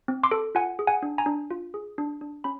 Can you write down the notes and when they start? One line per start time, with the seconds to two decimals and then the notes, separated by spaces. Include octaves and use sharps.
0.08 C4
0.23 C6 D6
0.31 A4
0.55 F4 F#5 G#5
0.79 G#4
0.87 F#5 G#5
1.03 D4
1.18 G#5 A#5
1.26 D4
1.51 F4
1.74 G#4
1.98 D4
2.21 D4
2.44 C#4 B5